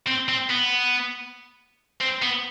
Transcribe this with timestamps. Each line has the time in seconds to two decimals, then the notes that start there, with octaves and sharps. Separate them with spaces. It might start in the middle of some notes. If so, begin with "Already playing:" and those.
0.07 C4
0.29 C4
0.50 B3
2.01 C4
2.22 B3